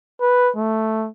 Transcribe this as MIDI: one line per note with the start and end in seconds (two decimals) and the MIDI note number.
0.21 0.51 71
0.56 1.08 57